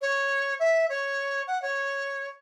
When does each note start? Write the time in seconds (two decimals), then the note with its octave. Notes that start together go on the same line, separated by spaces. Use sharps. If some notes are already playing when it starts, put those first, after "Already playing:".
0.01 C#5
0.59 E5
0.89 C#5
1.47 F#5
1.62 C#5